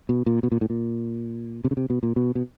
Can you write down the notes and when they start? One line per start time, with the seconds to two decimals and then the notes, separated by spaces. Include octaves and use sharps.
0.09 B2
0.26 A#2
0.43 B2
0.52 A#2
0.61 A2
0.70 A#2
1.64 C3
1.71 C#3
1.77 C3
1.90 B2
2.03 A#2
2.16 B2
2.35 B2